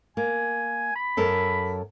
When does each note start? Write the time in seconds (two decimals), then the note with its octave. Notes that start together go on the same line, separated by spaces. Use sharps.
0.17 A#3 G#5
0.95 B5
1.17 F#2 A4 A#4